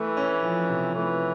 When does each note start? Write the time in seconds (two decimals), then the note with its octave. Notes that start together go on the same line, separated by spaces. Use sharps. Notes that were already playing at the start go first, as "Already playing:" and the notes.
Already playing: E3 A3
0.17 C#4
0.42 F3
0.69 C3
0.95 E3 A3